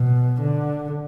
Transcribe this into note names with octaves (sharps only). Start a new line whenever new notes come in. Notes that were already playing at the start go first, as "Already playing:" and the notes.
Already playing: B2
D3